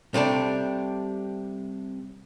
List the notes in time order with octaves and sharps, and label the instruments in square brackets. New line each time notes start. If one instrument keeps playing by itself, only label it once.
[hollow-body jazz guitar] C3 G3 A3 D4